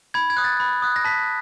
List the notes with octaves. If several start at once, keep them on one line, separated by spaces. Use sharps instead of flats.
B5 G#6
G#6
D#6 F#6
A6
B5
D#6 F#6
A#6
A5 B6